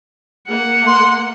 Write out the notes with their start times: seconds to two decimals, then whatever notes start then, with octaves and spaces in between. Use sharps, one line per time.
0.49 A#3 F#5
0.87 C6